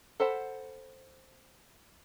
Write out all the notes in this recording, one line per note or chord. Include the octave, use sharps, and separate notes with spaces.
A4 C5 F#5 B5